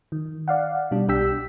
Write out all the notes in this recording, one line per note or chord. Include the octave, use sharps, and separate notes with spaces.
D#3
D5 F5 F#5
B2 G3 D4
B1 D4 G4 G5 E6 B6